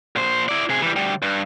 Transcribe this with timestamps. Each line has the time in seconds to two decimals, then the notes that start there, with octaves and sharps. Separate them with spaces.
0.16 A#2 C5
0.49 E4 D5
0.69 C3 G#4
0.82 E3 G3
0.96 D2 G3
1.22 G2